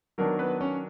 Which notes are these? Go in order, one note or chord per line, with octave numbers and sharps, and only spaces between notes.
D#3 F#3 B3 D4 A#4
B3 B4
C#4 C#5